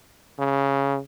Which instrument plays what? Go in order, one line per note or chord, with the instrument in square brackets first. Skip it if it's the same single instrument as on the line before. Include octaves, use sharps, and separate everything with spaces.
[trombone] C#3